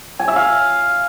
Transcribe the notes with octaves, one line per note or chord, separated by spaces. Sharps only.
G#5
E5
F5